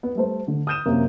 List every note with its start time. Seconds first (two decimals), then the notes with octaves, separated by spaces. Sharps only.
0.03 B3
0.15 G3 A3 C5
0.47 D3 A3
0.67 D#6 F6 G6 D#7 E7
0.86 F#2 C3 A#3